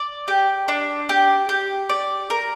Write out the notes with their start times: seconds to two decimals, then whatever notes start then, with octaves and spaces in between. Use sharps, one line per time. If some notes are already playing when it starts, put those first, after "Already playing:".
Already playing: D5
0.28 G4
0.68 D4
1.09 G4
1.49 G4
1.89 D5
2.30 A#4